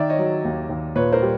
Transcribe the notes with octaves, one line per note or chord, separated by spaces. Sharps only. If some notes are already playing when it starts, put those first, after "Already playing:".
Already playing: D#3 D5 E5
C#5 D#5
F#3
D#2
D#2
A#2 B4 C#5
A#4 C5
G3